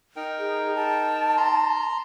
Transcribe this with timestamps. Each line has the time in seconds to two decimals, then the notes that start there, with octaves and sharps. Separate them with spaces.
0.16 D#4 A#4 G5
0.39 G#4
0.75 A5
1.37 A#5 C6